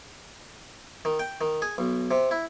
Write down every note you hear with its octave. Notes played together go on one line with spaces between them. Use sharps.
D#3
G5
D#3
G#4
B1
C3
E4